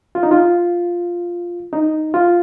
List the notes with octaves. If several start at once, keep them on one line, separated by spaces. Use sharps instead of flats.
F4
D#4
F4
D#4
F4